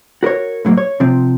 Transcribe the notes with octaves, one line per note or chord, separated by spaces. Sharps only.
F#4 A#4 B4 C#5
A2 D3 F#3 A#3
C#5
C3 F3 C4